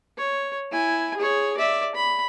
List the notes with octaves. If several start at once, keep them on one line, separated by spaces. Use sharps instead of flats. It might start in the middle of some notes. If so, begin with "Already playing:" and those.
C#5
E4 G#5
G#4 C#5
D5 E5
B5